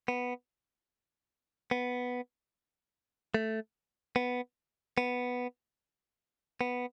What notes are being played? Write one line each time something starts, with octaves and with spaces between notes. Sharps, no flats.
B3
B3
A3
B3
B3
B3